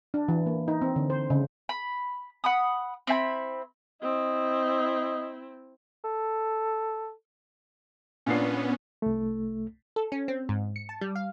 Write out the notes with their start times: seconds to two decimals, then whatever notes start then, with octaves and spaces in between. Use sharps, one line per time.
0.14 D4
0.28 E3
0.46 A#3
0.68 D#4
0.82 C4
0.96 D3
1.10 C5
1.30 C#3
1.69 B5
2.44 F#5 B5 D#6
3.07 C4 E4 G#5 B5
4.02 C4 E4 D#5
6.04 A4
8.26 A#2 B3 C#4 D4 C7
9.02 C2 A3
9.96 A4
10.12 C#4
10.28 C4
10.49 G#2
10.76 C#7
10.89 A5
11.01 G3
11.15 F5